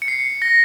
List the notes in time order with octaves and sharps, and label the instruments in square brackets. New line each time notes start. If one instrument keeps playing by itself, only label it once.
[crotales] C#7
C7
A#6